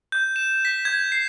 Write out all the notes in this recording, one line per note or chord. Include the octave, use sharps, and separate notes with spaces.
G6
E7
B6
G#6
C7